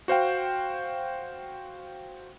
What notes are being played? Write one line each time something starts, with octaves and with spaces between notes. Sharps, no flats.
F#4 C5 F5 G5